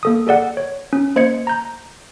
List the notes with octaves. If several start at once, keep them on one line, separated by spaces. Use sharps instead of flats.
A#3 A4 D#6
G#4 A4 D5 F#5
C#5
C#4
A#3 C5 D#5 G#6 C#7
A#5 G6